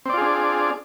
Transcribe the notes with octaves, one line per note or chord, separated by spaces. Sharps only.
C4 D4 F4 G#4 D5